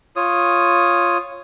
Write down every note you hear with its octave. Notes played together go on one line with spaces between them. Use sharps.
F4 C#5 D#6